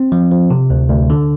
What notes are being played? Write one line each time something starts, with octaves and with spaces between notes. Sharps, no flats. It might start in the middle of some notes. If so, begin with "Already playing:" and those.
Already playing: C4
F3
F3
C3
D2
D2
D3